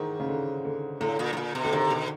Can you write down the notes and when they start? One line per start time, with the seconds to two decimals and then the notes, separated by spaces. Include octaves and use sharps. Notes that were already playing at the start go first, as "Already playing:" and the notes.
Already playing: G#2 D#3 E3
0.20 C#3
0.29 D3
0.65 D3
1.00 A2 D3
1.19 A#2
1.33 A2
1.37 A#2
1.55 B2
1.65 D3
1.73 C3 D#3
1.90 B2